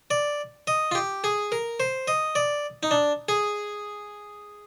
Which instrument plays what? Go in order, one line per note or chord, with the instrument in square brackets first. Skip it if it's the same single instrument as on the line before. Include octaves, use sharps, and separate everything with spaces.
[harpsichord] D5
D#5
F4
G4
G#4
A#4
C5
D#5
D5
D#4
D4
G#4